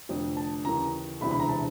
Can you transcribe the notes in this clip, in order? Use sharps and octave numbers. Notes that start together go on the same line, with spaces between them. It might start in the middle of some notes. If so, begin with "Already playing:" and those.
F1 F2 D3
A5
D#2 C#3 E3 A#5
E1 D2 C3 E3 B5
B5
A#5
A5